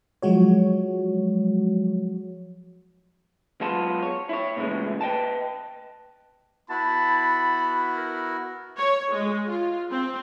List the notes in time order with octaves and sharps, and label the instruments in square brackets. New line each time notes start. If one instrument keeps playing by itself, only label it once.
[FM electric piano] F3 F#3 G#3 F#4 C#5
[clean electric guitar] F#3 G#3 B3 F4 A5
C#5
E4 C#5
A#2 C#3 E3 F#3 G#3 A3
B4 D#5 G5 A5
[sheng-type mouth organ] B3 E4 F#4 [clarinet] A5 [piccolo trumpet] B5
[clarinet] A#4
[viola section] C#5
G#3
F4
C4